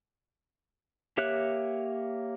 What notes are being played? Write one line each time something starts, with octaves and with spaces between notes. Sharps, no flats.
A#3 G4 C#5 E5 F#6